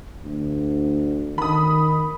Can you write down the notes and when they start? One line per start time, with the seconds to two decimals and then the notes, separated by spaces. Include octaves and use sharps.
0.24 D2
1.38 D#3 B5 D#6